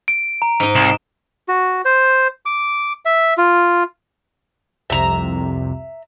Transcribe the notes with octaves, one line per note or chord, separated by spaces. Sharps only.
D7
A#5
G#2 D#4
C2 E7
F#4
C5
D6
E5
F4
C2 F2 C3 E5 A#5